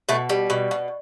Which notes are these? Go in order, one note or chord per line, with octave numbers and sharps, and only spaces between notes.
B2 A3
G3
B2
B2